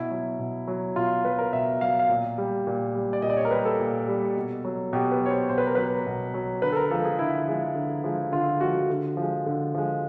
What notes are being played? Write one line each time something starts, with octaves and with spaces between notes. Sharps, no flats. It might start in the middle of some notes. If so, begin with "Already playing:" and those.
Already playing: B2 E4
F#3
B2
F#3
B2 F4
F#3 B4
A#4
B2 E5
F#3 F5
F5
A#2
G3
A#2
G3
D5
A#2 D#5
D5
C#5
A#4
G3 B4
A4
A#2
G3
B2
F#3
B2 G4
B4
F#3 C#5
C5
B2 C5
B4
A#4
F#3 B4
B2
F#3
D3 B4
A4
A#4
F3 G#3 A4
G#4
D3 E4
F3 G#3
D3
F3 G#3
D3 F4
F3 G#3 F#4
D3
F3 G#3
D3
F3 G#3